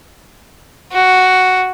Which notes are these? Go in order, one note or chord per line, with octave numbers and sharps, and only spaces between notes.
F#4